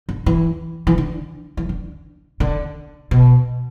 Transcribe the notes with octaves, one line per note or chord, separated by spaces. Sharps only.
D3
E3
E3
D3
E3
D3
D3
B2